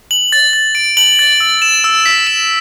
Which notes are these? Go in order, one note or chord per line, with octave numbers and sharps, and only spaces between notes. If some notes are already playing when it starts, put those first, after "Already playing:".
F#7
A6
A6
D7
F#7
A6
E6
E7
E6
B6
E7